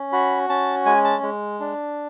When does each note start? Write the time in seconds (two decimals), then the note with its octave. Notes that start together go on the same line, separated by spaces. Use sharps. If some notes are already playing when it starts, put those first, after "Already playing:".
Already playing: C#4
0.13 F#4 B5
0.49 C#4 A5
0.86 G#3 G#5
1.04 A5
1.23 G#3
1.60 D4